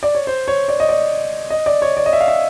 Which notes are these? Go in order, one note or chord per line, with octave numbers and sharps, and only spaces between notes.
D5
C#5
C5
C#5
D5
D#5
D5
D#5
D5
C#5
D5
D#5
E5
F5
E5